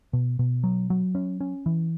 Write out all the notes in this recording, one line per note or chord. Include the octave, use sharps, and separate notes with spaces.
B2
B2
F#3
F#3
C#4
C#4
E3